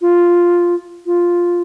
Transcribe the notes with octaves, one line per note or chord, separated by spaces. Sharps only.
F4
F4